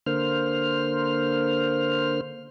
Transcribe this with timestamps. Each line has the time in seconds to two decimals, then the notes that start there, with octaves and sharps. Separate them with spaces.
0.06 D3 A#3 C5 F6